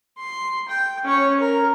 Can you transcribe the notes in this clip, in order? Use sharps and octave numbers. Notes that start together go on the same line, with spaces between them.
C6
G5
C#4 C#5
A#4